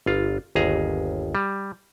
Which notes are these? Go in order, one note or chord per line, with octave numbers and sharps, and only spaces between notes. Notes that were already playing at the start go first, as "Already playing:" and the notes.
G1 F4
G1 D#2 G#4 A#5
G3